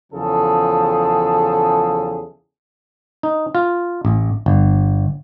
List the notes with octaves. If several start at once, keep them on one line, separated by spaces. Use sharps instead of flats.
E2 C#3 F3 G#4 A4
D#4
F4
A1
G1